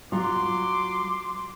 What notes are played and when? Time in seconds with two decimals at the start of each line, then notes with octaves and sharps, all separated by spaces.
0.12 F#3 F4 C6 D6